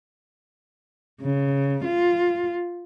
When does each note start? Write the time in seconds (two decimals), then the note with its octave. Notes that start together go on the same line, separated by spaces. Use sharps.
1.22 C#3
1.85 F4